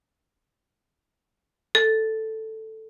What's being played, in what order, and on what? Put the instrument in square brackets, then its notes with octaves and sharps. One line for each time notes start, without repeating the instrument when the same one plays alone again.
[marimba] A4